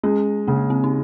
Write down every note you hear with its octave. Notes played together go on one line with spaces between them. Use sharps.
G#3 C#4
C#3 A#3
C4
D#4